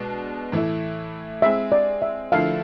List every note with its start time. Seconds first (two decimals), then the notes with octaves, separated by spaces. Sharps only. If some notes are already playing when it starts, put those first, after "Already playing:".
Already playing: B2 G#3 D4
0.52 A2 E3 A3 E4
1.42 G#3 C4 G#4 E5
1.72 D5
2.02 E5
2.32 D3 F3 A3 E4 F5